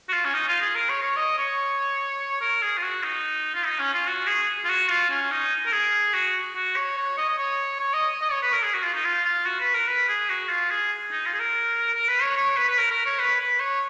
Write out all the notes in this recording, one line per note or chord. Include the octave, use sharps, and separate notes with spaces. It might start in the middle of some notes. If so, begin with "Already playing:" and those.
F#4
F4
C#4
D#4
F4
G#4
A#4
C#5
C#5
D#5
C#5
A#4
G#4
F4
F#4
D#4
F4
D#4
C#4
F4
F#4
G#4
F4
F#4
F4
C#4
D#4
A#4
G#4
F#4
F#4
C#5
C#5
D#5
D#5
C#5
C#5
D#5
D#5
C#5
B4
A#4
G#4
F#4
F4
D#4
F4
F4
F#4
B4
A#4
B4
G#4
F#4
F4
G#4
D#4
F4
G#4
A#4
A#4
B4
C#5
C#5
B4
B4
A#4
A#4
C#5
B4
B4
C#5